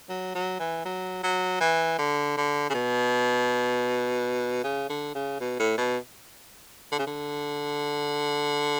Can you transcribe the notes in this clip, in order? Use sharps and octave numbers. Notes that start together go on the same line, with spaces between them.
F#3
F#3
E3
F#3
F#3
E3
D3
D3
C#3
B2
C#3
D3
C#3
B2
A2
B2
D3
C#3
D3